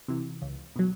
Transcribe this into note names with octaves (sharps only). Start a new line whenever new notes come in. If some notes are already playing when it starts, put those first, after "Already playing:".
C3 E3
C#2
B2 F#3